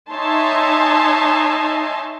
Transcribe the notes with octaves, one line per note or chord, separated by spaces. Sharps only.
D#4 C#5 E5 G#5 A5 C6